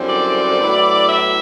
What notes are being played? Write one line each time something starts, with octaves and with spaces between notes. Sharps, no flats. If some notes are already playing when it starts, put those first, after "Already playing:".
Already playing: F#2 D3 G3 C4 E4
D5
A2 F#3 B3 E4
E5